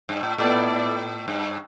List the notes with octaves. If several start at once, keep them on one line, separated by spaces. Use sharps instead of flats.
G2
A2
A2 B3 E4 A4 D5
G2